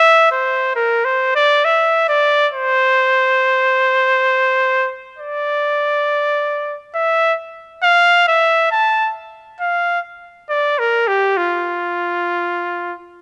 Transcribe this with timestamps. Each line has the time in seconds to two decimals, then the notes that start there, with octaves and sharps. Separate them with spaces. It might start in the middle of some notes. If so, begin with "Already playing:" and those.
Already playing: E5
0.32 C5
0.76 A#4
1.05 C5
1.35 D5
1.65 E5
2.09 D5
2.54 C5
5.19 D5
6.95 E5
7.83 F5
8.28 E5
8.71 A5
9.61 F5
10.50 D5
10.79 A#4
11.08 G4
11.37 F4